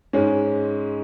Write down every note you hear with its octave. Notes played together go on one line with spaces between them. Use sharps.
G#2 G#3 C#4